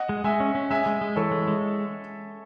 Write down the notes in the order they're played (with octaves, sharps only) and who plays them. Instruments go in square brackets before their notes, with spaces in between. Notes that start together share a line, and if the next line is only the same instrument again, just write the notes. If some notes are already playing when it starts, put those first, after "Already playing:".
Already playing: [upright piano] D#5 F#5
[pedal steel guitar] G#3
[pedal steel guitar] G#3 [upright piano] E5 G#5
[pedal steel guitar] C#4
C#4
[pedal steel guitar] G#3 [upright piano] E5 G#5
[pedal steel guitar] G#3
G#3
[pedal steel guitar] E3 [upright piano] A4 C#5
[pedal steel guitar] G#3
G#3